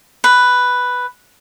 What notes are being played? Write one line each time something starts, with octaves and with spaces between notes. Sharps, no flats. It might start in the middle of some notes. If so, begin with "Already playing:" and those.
B4